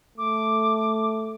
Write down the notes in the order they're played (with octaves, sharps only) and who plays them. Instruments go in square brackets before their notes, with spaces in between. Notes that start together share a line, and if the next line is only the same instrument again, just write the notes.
[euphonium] A3 [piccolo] D6